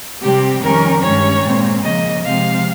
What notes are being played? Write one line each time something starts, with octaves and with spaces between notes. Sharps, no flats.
C3 G3 C4 G4
F2 D#3 G3 C#4 A#4
G2 D#3 G#3 C#4 C#5
A#2 G#3 C4
C#3 F3 A#3 D#5
C3 F3 G#3 C4 F5